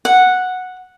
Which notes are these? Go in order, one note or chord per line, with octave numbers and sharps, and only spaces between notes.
F#5